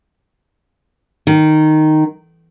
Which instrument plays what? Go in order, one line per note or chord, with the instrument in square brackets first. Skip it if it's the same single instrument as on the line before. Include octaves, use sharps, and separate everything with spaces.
[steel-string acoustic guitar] D#3